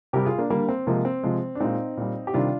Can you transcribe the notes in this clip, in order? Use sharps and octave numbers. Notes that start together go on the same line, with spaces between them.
C3 G3 G4 A#4
F4 G#4
A#3 D4
D3 G3 A#3
C4
C3 F3 G#3 A#3
C4
C3 F3 G#3
D4
A#2 G#3 C4 D#4
A#2 G3
G4
C3 D#3 G3 D4 F4